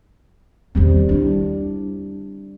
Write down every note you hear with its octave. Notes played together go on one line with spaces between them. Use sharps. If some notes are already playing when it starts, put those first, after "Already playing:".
E2 D#3 G3 C4
G3 D4 E4